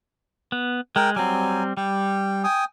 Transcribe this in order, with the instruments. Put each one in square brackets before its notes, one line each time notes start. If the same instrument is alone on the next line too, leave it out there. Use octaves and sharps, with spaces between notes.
[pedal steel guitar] B3
[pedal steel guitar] G#3 [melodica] A#4 G5
[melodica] F#3 G#5 [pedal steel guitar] G3 C4
[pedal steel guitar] G3 [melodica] G5
[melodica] G5 G#5 D#6